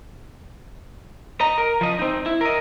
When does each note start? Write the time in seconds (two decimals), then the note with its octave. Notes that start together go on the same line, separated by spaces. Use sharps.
1.40 D#5 A#5
1.58 A#4
1.81 F3 D#5
1.99 C4 D#4
2.26 E4
2.41 A#4 D#5